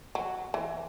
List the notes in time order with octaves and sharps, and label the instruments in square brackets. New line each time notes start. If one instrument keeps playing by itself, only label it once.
[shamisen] F#3
E3